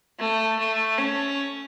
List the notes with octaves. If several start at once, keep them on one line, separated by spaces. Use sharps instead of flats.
A3
A3
C#4